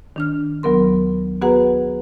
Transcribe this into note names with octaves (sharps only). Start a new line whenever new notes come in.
D#3 D4 F6
D2 F#3 B3 A#4 C6
B3 F#4 G#4 B4 F#5 A#5